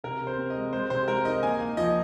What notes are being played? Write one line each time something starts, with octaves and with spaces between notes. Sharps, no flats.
C3 A#4
C3
C5
C4
D#5
G#3
G#3 C5
C3 C5
G#3 A#4
D#4 D#5
A#3 G#5
A#3
F3 D#5